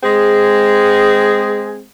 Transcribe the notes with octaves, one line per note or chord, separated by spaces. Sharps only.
G#3 C4 G#4